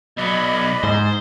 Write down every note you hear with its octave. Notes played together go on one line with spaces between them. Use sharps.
B1 F#3 D5 D#5 B5
G#2 C5